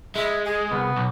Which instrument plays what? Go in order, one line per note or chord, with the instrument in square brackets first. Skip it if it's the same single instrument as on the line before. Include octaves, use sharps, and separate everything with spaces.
[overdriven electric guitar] G#3 [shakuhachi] E5
[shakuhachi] G#4
[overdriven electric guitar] C2 [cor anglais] B3
[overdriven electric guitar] B1